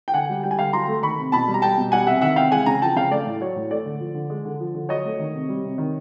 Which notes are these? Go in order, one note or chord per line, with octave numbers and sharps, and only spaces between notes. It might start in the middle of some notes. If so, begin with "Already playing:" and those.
G5
D3 F#5 G#5
G3
G3 G5
G#5
D3 F5 G5
F#3 A#5 C6
A3
D#3 B5 C#6
C3
B2 A5 B5
G3
A#5
G3 G5 A5
B2
G3 F#5 G#5
C3 E5 F#5
D#3 E5 F#5
C3 F5 G5
G#3 F#5 G#5
C#3 G#5 A#5
F3 G5 A5
C#3 F5 G5
A3 D5
A2
F#3 C#5
A2
A3 D5
D3
F3
D3
G#3
D3
F3
D3
F#3 C#5 D#5
A3
D#3
C3
G3
C3
D#3